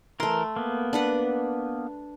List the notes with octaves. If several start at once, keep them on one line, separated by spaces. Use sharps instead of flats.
E3 A3 A#4 C6
A#3 B3
D4 B4 F#5